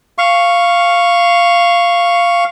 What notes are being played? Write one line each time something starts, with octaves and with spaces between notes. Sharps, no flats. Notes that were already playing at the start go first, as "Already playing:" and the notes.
F5 C#6